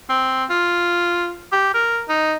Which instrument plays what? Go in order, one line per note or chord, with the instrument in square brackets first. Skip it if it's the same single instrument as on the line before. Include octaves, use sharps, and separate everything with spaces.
[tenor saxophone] C4
F4
G4
A#4
D#4